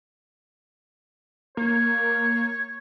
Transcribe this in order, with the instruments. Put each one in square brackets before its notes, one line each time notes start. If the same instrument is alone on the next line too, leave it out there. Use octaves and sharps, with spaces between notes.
[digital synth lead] A#3 [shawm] C#5